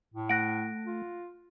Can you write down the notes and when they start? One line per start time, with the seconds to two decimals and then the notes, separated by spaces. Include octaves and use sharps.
0.14 A2
0.29 A3 F#5 F#6 A#6 D7
0.86 F4